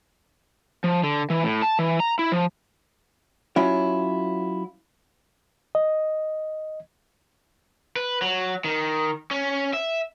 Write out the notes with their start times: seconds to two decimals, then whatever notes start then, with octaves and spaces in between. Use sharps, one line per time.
0.84 F3
1.04 D3
1.30 E3
1.43 A2
1.62 A5
1.79 E3
2.00 A#5
2.19 E4
2.32 F3
3.56 F#3 C#4 E4 F4
5.75 D#5
7.96 B4
8.22 F#3
8.64 D#3
9.31 C#4
9.73 E5